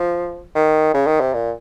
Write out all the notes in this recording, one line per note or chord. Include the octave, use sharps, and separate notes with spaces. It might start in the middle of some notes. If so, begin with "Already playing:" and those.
Already playing: F3
D#3
C#3
D#3
C3
A#2